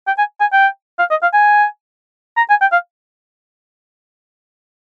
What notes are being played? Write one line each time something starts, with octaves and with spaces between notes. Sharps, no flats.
G5
G#5
G#5
G5
F5
D#5
F5
G#5
A#5
G#5
G5
F5